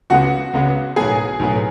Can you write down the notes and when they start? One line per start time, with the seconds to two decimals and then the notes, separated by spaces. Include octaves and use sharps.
0.10 C#2 C#3 G#3 B3 F#4 F#5
0.53 C#2 C#3 G#3 B3
0.96 B1 A2 F#3 B3 G#4 G#5
1.39 B1 A2 F#3 B3